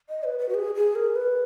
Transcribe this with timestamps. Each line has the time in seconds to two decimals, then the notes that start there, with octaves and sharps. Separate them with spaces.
0.09 D#5
0.24 B4
0.39 B4
0.49 F#4
0.55 G#4
0.75 G#4
0.95 A#4
1.16 B4